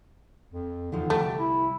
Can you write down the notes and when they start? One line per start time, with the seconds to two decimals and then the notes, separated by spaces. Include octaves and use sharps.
0.53 F2
0.92 E2 D3 D#3 F3
1.10 C2 A3 G4
1.39 E4